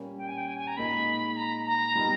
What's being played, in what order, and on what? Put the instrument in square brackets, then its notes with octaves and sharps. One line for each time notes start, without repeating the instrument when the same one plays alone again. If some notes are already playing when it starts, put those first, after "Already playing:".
Already playing: [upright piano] A#2 G3 A#3 C#4
[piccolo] G5
G#5
G5
G#5
G#5
A#5
[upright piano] A#2 G#3 D#4 [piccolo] B5
[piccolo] A#5
A#5
[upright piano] G3 B3 D#4